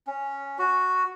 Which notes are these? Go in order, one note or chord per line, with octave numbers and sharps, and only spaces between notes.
C#4
F#4